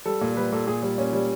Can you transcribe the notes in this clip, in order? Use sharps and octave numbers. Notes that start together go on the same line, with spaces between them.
G3 A4
A#2
G3 B4
A#2 A4
A#2 G#4
G3
A#2 C#4
G3